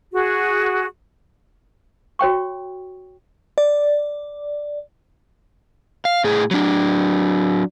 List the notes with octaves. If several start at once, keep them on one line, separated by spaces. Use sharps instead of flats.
F#4 G#4
F#4 C#5 G5 C#6
D5
F5
A2 G#4
F#3 D4